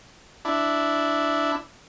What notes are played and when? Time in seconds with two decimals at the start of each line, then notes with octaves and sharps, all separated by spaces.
0.45 D4 E4